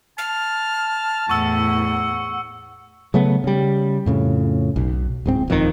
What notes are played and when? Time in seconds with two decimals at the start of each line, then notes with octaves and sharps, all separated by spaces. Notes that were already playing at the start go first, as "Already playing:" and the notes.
0.18 A5 F6
1.30 E2 A2 F#5 C#6 E6
3.14 C#3 F#3 A3 B3
3.44 C#3 G3
4.06 F2 A2 C#3
4.76 B1
5.26 D1 G#2 C4
5.48 D#1 F2 D#3